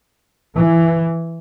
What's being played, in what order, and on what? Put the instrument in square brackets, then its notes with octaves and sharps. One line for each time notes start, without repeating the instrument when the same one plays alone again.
[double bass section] E3